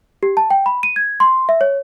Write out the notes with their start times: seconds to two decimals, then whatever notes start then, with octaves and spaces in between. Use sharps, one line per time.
0.23 G4
0.37 A5
0.50 G5
0.66 B5
0.83 D#7
0.96 G#6
1.20 C6
1.49 E5
1.61 C#5